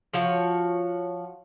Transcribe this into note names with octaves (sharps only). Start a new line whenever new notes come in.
F3 F#4 C#5